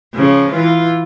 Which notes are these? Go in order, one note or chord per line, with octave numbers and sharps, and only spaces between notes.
C#3 F3
E3 F4